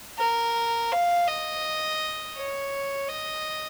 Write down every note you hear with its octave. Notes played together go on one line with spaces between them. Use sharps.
A#4
F5
D#5
C#5
D#5